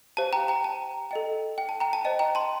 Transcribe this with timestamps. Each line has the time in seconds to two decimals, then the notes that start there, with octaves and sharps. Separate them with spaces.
0.17 G4 C5 F5 A5
0.33 G5 A#5
0.48 G5 A#5
0.64 A5
1.11 A4 D#5 G5
1.58 G5
1.69 A5
1.80 G5 A#5
1.93 A5
2.04 C5 D#5 G5 A5
2.19 G5 A#5
2.35 A5 C6